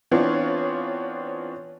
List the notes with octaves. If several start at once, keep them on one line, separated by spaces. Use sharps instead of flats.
E3 B3 C4 D4 F4 C#5